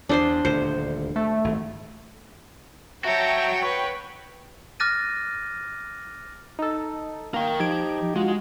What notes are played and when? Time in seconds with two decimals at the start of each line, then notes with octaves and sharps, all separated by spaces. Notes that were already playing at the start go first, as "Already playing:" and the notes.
0.09 E2 D4 C5 C6
0.45 D#1 D2 C5
1.16 A3
1.44 G#1
3.04 F#4 C#5 E5 G5 A5 A#5
3.62 B4 C#5 C#6
4.80 D6 F6 F#6 A6 A#6 D#7
6.59 D#4 A4
7.34 A#3 A#4 G5
7.60 F3 D#4 G4 G#6 D7
8.16 G#3 F4 F#4